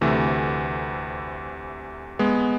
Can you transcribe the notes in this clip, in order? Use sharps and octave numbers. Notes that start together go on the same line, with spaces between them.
D2 C3 E3 A3
G#3 B3